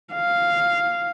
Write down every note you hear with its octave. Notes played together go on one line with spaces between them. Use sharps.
F5